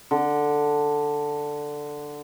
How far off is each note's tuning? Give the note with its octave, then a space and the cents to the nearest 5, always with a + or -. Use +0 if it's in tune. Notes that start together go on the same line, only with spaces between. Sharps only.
D3 +5